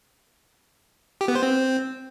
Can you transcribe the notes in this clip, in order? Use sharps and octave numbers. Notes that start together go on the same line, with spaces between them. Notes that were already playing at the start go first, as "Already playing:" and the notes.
G4
B3
C5
C4